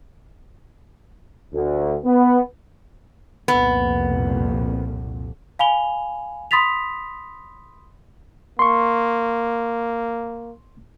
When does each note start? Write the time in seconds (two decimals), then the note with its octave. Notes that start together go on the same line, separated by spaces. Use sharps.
1.54 D2
2.05 B3
3.48 C2 F2 A#2 B3
5.59 F5 G#5 B5 F7 G7
6.51 B5 C6 D#6 A6 B6 F7
8.59 A#3 C6 C#6